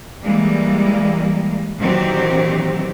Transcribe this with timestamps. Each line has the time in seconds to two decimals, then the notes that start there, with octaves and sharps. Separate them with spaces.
0.22 E3 G3 G#3 A#3
1.77 A#2 D#3 E3 F#3 C4 G4